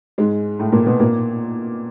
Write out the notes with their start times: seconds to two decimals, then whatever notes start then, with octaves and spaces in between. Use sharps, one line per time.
0.18 G#2 G#3
0.59 A2 A3
0.72 A#2 A#3
0.86 B2 B3
1.00 A#2 A#3